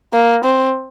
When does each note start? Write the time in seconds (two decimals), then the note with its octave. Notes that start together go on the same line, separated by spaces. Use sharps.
0.13 A#3
0.44 C4